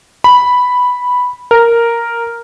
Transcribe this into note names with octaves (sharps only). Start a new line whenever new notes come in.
B5
A#4